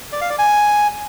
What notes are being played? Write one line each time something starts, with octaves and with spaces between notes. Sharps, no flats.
D5
F5
D5
G#5